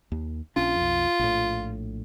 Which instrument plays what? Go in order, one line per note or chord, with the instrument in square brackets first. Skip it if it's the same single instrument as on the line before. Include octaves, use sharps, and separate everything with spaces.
[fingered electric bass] D#2
[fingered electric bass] A#1 C#4 D4 [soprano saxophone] F4
[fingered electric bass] B1 F2
A#1 A2